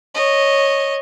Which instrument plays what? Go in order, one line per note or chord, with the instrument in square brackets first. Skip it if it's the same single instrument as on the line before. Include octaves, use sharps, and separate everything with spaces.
[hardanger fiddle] C#5 D#5